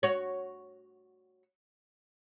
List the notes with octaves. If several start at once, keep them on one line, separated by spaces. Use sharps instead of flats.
F#4 C#5